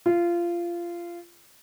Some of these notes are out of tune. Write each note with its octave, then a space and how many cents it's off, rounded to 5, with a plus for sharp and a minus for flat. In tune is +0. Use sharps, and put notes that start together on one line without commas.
F4 -20